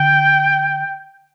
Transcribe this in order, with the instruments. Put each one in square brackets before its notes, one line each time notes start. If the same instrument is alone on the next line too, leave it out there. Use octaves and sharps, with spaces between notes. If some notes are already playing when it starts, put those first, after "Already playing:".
Already playing: [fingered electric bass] D3 [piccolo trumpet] G5